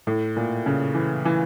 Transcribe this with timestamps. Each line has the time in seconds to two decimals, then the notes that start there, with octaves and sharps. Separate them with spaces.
0.07 A2
0.36 A#2
0.66 C#3
0.95 E3
1.25 E3